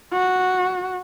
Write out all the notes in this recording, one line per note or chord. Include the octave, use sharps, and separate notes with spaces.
F#4